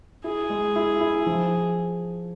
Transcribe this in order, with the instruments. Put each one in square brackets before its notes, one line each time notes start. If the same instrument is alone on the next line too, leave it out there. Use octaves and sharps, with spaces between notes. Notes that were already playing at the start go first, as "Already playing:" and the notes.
[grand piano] E4 [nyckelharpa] G#4
[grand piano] G#3
E4
E4
F3